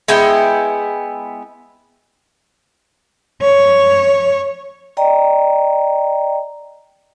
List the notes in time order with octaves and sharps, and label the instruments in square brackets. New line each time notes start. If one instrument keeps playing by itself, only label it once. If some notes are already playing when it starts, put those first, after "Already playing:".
[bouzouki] G#3 B3 E4 G5
[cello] C#5
[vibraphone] D5 D#5 G5 A#5